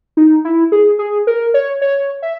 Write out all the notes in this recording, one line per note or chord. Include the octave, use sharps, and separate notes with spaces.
D#4
E4
G#4
G#4
A#4
C#5
C#5
E5